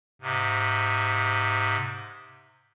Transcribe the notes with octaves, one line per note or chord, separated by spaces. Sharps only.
G#2 C3